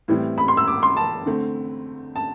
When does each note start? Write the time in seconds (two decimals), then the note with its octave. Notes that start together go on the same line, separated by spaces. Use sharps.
0.08 A2 E3 G3 C4 E4
0.38 B5
0.48 C6
0.57 E6
0.68 D6
0.83 C6
0.97 A5
1.26 D3 A3 C4
2.16 A5